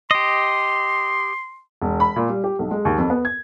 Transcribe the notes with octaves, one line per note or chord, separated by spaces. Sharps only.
G4 D#5 C6
E1
B5
A#2
G3
G4
B1
G#3
D#2
F2
B3
G#6